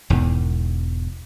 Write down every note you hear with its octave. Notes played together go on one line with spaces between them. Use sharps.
E1 E2 G#2